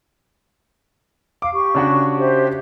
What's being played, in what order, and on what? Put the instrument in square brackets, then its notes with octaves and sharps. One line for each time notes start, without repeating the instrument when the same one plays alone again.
[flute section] F5 [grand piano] D6
[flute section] G4 C#6
[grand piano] C#3 D4 F#4
[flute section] G4 C5 E5